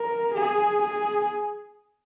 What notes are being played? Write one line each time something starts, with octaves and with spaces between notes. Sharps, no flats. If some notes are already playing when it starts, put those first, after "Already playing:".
Already playing: A#4
G#4
G#4